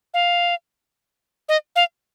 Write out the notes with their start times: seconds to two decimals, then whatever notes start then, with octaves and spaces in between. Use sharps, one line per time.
0.14 F5
1.49 D#5
1.76 F5